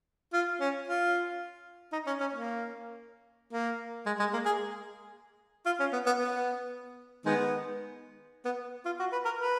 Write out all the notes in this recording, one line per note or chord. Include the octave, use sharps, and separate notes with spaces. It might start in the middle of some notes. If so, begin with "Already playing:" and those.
F4
C#4
F4
D#4
C#4
C#4
A#3
A#3
G#3
G#3
A#3
G#4
F4
C#4
B3
B3
B3
D#3 G#3 B3
B3
F4
F#4
B4
A#4
B4